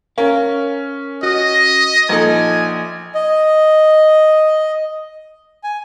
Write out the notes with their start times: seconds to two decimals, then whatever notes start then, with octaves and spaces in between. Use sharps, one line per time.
0.18 C#4 A#4 F5
1.23 F#4 D#5
2.09 A#1 D#4 A4 G#5 A#5
3.15 D#5
5.64 G#5